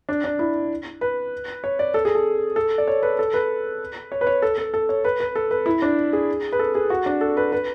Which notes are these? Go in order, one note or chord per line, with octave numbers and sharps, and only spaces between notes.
D4
D4
E4
B4
C#5
D5
A4
G#4
A4
A4
D5
C#5
B4
A4
B4
C#5
B4
C#5
A4
A4
A4
C#5
B4
B4
A4
B4
E4
D4
G#4
B4
A4
G#4
F#4
D4
A4
B4
B4